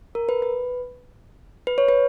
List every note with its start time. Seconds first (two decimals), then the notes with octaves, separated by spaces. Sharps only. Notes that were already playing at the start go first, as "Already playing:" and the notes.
0.15 A#4
0.29 B4
0.42 B4
1.67 B4
1.78 C#5
1.89 B4